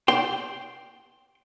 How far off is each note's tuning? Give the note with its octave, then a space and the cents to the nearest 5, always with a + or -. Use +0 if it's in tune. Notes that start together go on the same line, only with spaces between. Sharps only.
G5 +0 C6 +0